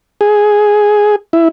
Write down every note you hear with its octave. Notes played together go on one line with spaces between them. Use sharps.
G#4
E4